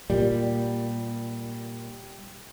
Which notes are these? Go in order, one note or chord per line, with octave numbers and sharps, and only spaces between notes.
A#2 G3